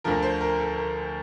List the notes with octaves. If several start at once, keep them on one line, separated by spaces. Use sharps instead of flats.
D2 D3 F3 A#4
C5
A#4
A4
A#4